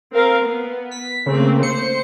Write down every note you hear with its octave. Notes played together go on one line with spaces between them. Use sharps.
C4 A#4 F5
B3
B6
C#3 A3 A#3 C4
C5 C#7